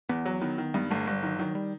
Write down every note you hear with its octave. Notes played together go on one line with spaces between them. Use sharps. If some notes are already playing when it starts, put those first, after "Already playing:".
E2 B3
F#3
D#3 B3
D#3
G2 B3
G1 A3
G1 G3
D#3 F#3
D#3 F#3
G3